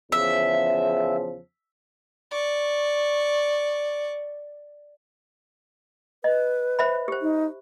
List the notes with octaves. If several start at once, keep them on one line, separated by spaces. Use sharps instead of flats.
E2 C#3 F3 E5
D5 C#6
B4 D#5
C5 E5 B5
G4 C5
D#4